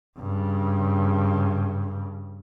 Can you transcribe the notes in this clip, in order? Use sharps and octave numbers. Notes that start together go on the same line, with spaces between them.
G2 C#3